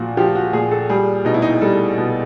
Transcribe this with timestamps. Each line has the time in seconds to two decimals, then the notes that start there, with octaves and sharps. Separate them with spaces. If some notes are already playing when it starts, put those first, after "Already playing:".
Already playing: A#2 F3 F#4
0.17 F3 G4
0.35 F#4
0.53 A#2 G#4
0.71 A4
0.89 G3 G#4
1.25 B2 D#4
1.34 E4
1.42 D#4
1.62 G3 A4
1.98 B2